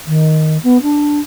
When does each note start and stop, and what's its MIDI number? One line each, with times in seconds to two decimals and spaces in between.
0.06 0.57 51
0.63 0.78 59
0.82 1.20 62